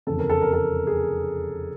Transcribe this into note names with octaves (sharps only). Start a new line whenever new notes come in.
F1 E2 C#3 A4
A#4
A4
A#4
A4
G#4